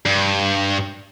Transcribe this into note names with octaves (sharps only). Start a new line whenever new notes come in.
G2